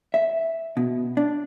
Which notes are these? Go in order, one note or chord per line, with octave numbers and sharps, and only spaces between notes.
E5
B2
D4